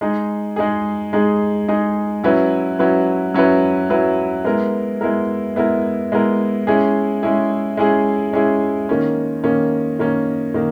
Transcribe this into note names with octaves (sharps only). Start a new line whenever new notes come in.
G#3 D#4 G#4
G#3 D#4 G#4
G#3 D#4 G#4
G#3 D#4 G#4
F#3 C#4 E4 B4
F#3 C#4 E4 B4
F#3 C#4 E4 B4
F#3 C#4 E4 B4
G#3 B3 E4 A#4
G#3 B3 E4 A#4
G#3 B3 E4 A#4
G#3 B3 E4 A#4
G#3 C#4 E4 G#4
G#3 C#4 E4 G#4
G#3 C#4 E4 G#4
G#3 C#4 E4 G#4
D#3 A#3 C#4
D#3 A#3 C#4
D#3 A#3 C#4
D#3 A#3